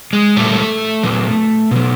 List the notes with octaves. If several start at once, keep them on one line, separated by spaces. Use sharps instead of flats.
G#3 G#4
A#2 G3 A3 A4
A#2 F#3
B2 F#3